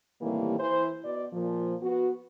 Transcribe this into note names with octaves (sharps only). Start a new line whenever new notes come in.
A2 C3 D#3 E3 G3 A#3
E3 C5
B2 D5
A#2 F3
B3 F#4